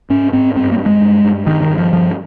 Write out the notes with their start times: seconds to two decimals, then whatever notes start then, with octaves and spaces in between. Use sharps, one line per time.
0.10 G#2 C#4
0.32 G#2 C4
0.56 G2 C4
0.72 A#3
0.78 G2
0.86 G#3
1.01 G2
1.24 G2
1.46 G2 D#3
1.62 D#3
1.70 G2
1.78 F3
1.93 G2 F3